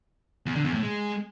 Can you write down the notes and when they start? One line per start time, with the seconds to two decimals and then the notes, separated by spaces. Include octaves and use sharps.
0.46 E2
0.55 D3
0.64 E2
0.74 A2
0.83 G#3